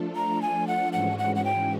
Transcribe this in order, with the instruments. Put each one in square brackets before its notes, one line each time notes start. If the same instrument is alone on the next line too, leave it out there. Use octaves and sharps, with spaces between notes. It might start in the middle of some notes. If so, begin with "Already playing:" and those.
Already playing: [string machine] F3 A3 D4 F4 A4
[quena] A#5
G#5
F#5
[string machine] G#2 E3 G#3 C#4 F#4 [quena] F#5
[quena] F#5
F#5
G5